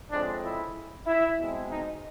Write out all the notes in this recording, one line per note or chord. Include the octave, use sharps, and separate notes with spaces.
A2 F3 G#3 C4 D4
E4
E4
B2 G#3 C4
D#4